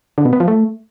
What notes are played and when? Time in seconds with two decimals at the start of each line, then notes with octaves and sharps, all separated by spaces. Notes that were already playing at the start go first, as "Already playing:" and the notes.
0.18 D3
0.25 B2
0.33 B3
0.40 F3
0.48 A3